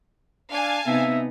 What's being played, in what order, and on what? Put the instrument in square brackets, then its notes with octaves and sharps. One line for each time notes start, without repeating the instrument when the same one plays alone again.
[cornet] D4 [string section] F5 G#5 A5
[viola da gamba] C3 B3 D#4 [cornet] E5